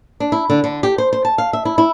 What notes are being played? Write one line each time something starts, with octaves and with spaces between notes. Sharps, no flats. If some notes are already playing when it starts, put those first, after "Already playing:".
D4
E4
D3
D3
G4
C5
C5
A5
F5
E5
E4
E4